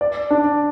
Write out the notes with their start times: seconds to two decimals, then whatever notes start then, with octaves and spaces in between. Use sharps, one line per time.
0.01 D5
0.31 D4